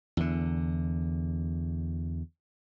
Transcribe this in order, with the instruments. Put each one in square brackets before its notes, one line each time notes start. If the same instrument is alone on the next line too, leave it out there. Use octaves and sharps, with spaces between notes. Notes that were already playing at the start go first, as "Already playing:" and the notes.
[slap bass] E2 D3